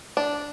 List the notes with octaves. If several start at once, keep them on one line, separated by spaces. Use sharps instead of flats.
D4